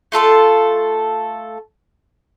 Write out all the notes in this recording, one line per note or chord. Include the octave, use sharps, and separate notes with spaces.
A3 F4 A4 C6